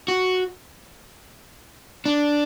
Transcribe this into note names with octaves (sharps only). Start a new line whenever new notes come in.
F#4
D4